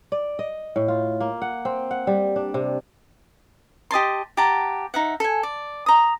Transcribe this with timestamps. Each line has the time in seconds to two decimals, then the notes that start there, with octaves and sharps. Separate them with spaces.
0.12 D5
0.39 D#5
0.76 A2
0.88 F4
1.21 A#3
1.42 F#5
1.65 C4
1.91 F#5
2.07 G3
2.36 D4
2.54 C3
3.91 G4 D#5 A5 C6
4.37 G4 F#5 A5 A#5
4.94 D#4 E5 F#5
5.20 A4 G#5
5.43 D5
5.86 A#5 D#6